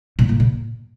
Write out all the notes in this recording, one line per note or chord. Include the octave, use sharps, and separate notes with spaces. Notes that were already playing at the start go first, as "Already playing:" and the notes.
A#2
A2
A#2